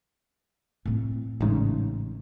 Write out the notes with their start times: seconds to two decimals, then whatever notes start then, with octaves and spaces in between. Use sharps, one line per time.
0.85 A2 C4
1.41 A1 G#2 C#3